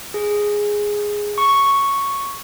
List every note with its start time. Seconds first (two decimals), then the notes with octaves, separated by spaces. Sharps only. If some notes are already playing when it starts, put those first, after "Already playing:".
0.14 G#4
1.38 C#6